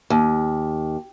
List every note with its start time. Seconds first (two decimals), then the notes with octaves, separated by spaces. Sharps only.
0.10 D#2